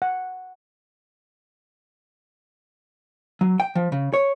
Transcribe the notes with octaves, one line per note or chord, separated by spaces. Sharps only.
F#5
F#3
G5
F3
C#3
C#5